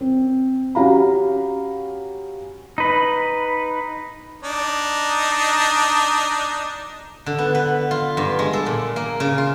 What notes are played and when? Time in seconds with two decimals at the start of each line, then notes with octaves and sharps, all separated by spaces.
0.01 C4
0.75 C#4 F#4 G4 F5 A#5 B5
2.78 D#4 B4
4.43 D4 D#4
7.26 D3
7.39 B3
7.55 B4
7.91 F4
8.17 G2
8.39 G#3
8.53 A4
8.66 A#2
8.96 A#3
9.20 C#3
9.38 F4